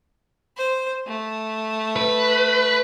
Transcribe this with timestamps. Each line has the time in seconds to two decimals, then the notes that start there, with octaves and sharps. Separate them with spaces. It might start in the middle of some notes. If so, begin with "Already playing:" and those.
0.57 C5
1.07 A3
1.96 B4